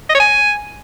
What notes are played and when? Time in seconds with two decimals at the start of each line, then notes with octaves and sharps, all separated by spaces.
0.09 D#5
0.15 C#5
0.20 G#5